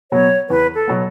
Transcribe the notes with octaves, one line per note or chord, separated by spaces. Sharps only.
B2 F#3 B3 C#5
E2 B4
A4
B2 F#3 B3